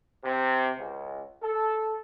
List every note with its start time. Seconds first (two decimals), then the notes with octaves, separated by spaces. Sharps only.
0.24 C3
0.77 C#2
1.42 A4